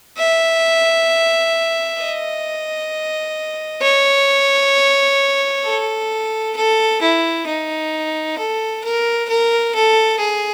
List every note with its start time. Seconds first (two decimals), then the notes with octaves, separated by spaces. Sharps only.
0.18 E5
2.00 D#5
3.82 C#5
5.64 A4
6.56 A4
7.01 E4
7.47 D#4
8.38 A4
8.84 A#4
9.28 A#4
9.74 A4
10.20 G#4